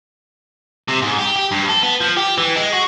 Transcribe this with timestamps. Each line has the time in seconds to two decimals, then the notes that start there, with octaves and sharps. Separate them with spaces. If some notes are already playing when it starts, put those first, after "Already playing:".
0.88 C3
1.02 G#2
1.18 G4
1.36 G4
1.51 G2
1.69 A4
1.83 B3
2.00 F3
2.17 G4
2.38 E3
2.56 G#3
2.73 F#4